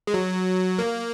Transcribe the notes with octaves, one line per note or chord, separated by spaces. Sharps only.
G#3
F#3
A#3